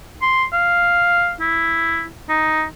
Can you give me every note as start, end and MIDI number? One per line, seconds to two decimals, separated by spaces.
0.22 0.45 84
0.53 1.33 77
1.40 2.07 64
2.29 2.64 63